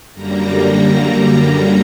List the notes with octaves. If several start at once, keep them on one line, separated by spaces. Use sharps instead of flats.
F#2 D3 G3 A#3 A#5
A#5
A#5